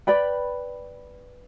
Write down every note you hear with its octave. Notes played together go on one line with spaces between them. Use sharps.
B4 D5 G5 B5